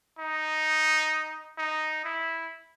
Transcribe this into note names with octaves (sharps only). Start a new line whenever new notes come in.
D#4
D#4
E4